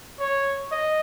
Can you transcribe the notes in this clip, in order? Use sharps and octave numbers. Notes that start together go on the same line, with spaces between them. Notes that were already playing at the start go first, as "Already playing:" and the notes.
C#5
D#5